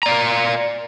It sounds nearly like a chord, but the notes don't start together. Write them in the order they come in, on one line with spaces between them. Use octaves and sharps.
A#5 D5 F5 A#4